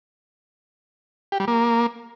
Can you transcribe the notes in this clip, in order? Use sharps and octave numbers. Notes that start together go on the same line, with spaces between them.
G4
G3
A#3